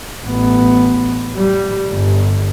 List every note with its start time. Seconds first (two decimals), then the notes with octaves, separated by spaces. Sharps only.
0.25 A1 B3
1.36 G3
1.88 G1